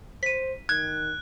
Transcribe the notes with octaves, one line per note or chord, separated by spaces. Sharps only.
C5 B6 D#7
D#3 F#6 G#6